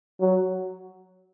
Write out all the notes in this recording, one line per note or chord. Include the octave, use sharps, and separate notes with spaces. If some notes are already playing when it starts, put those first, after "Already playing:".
F#3